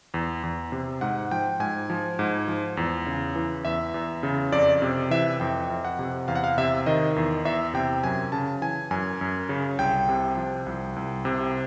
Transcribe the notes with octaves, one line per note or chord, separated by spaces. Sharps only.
E2
E2
C3
G#2 F#5
F3 G5
G#2 G#5
F3
G#2
F3
E2
C#3
E3
E2 E5
E2
C#3
F2 D5
C3
E3 E5
F2 G5
F2
F#5
C3
E2 F5
F#5
F5
C3 E5
D#3 D#5
E2
E2 E5
C3 G5
F#2 G#5
C#3 A5
E3 G#5
F#2 G#5
F#2
C#3
C2 G5
C3
F3
C2
C2
C3